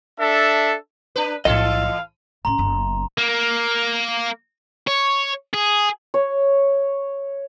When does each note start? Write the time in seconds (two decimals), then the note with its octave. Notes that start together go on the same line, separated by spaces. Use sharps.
0.20 D4 A4 E5
1.16 D4 B4
1.45 B1 A2 E3 A4 D#5 F5
2.45 A2 C#4 A#5 C6
2.58 F#1 B3
3.18 A#3
4.87 C#5
5.53 G#4
6.14 C#5